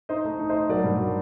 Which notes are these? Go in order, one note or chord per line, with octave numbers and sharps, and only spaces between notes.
D#4 C5 D#5
A3
D#4
C5 D#5
D#4
F#3 A#4 D5
G2
F#3